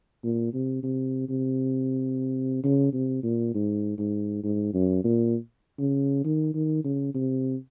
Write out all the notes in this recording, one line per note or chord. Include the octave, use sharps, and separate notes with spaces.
A#2
C3
C3
C3
C#3
C3
A#2
G#2
G#2
G#2
F#2
A#2
C#3
D#3
D#3
C#3
C3